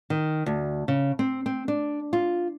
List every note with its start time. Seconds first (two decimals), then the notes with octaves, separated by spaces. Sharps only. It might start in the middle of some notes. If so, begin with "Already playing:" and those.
0.10 D#3
0.46 D2
0.88 C#3
1.19 C4
1.46 C4
1.68 D4
2.13 F4